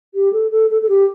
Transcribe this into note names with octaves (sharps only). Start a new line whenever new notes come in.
G4
A4
A4
A4
A4
G4